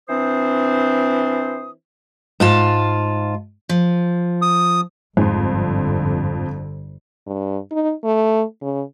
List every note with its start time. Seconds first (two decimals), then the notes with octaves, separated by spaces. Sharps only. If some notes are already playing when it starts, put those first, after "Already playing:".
0.09 E3 C4 D4 C5 D#6
2.40 G#2 F4 A5
3.69 F3
4.42 D#6
5.17 G1 F2 G#2 D3 C6
7.27 G2
7.71 D#4
8.03 A3
8.62 C#3